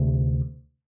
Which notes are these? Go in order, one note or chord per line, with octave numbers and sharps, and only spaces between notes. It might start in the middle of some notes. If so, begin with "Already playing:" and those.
Already playing: D2 C3